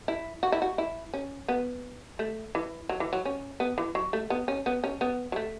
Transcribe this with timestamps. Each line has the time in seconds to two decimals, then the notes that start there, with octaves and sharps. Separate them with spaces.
0.08 E4
0.43 F#4
0.52 E4
0.62 F#4
0.78 E4
1.14 C#4
1.48 B3
2.19 A3
2.55 E3
2.89 F#3
3.00 E3
3.13 F#3
3.25 C#4
3.60 B3
3.78 E3
3.95 F#3
4.13 A3
4.30 B3
4.48 C#4
4.66 B3
4.84 C#4
5.01 B3
5.32 F#3
5.36 A3